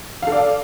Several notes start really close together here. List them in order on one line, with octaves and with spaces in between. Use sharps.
F5 A4 D5